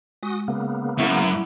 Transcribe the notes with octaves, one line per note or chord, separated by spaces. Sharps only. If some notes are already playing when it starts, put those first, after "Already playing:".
G#3 F#4 D#6
C#3 A#3 B3
F#2 E4 E5